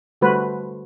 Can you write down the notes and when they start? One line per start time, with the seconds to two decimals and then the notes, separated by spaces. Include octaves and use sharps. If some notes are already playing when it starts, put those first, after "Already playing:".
0.21 D3 G3 A3 F#4 B4 C5